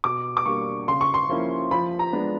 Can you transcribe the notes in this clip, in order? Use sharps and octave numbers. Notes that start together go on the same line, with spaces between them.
B2 D6
D6
G3 A#3 D4 C#6
C#3 C6
C#6
C6
F3 A#3 C#4 E4
F3 B5
A#5
G#3 B3 D4